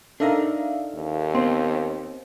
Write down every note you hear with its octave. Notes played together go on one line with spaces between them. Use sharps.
D4 D#4 A4 A#4 E5 F5
D#2
B3 C4